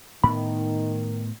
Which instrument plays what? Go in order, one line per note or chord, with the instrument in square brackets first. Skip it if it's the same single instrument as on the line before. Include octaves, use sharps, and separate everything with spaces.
[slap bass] A2 B3 [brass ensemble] D#3 [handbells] B5